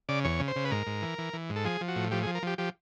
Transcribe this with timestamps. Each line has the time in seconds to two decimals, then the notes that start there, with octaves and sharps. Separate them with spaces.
0.09 C#3 D5
0.24 E2 C#5
0.40 C#3
0.48 C5
0.56 C#3
0.65 B4
0.71 G#2 A#4
0.87 G#2
1.02 E3
1.18 E3
1.33 E3
1.49 G#2
1.56 A4
1.65 F3 G#4
1.81 F3
1.88 F#4
1.96 A2
2.11 F3 G4
2.23 G#4
2.27 F3
2.35 A#4
2.43 F3 G4
2.58 F3 G4